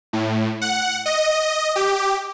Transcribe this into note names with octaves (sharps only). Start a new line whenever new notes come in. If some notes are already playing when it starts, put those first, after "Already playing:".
A2
F#5
D#5
G4